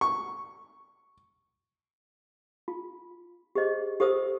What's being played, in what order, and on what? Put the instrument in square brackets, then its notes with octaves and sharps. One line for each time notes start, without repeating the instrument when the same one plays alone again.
[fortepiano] C#6
[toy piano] F4
G4 G#4 C5 D#5
G4 A4 C5 D#6 E6